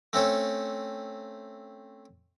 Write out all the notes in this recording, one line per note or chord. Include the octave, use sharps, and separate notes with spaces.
A3 C4 C#4 A4